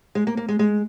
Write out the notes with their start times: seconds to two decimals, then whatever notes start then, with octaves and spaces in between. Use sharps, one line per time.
0.15 G#3
0.27 A#3
0.37 A#3
0.49 G#3
0.59 G#3